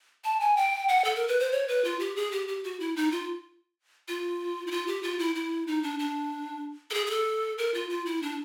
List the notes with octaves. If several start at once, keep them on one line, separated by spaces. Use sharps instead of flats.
A5
G#5
G5
F#5
A4
A#4
B4
C5
C#5
B4
F4
G4
G#4
G4
G4
F#4
E4
D#4
F4
F4
E4
F4
G4
F4
E4
E4
D#4
D4
D4
A4
G#4
G#4
A4
A#4
F4
F4
E4
D4